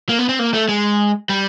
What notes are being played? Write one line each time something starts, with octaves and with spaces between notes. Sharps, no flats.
A#3
B3
C4
A#3
A3
G#3
G3